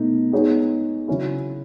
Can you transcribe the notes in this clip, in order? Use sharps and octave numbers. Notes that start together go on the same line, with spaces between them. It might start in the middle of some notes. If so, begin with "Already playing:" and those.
Already playing: B2 A3 D#4
G#3 B3 D#4 G#4 C#5
C#3 F#3 C#4 E4